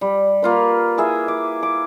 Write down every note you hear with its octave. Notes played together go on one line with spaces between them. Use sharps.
G3
A#3 F4 B4
E4 G#4 E5
D6
D6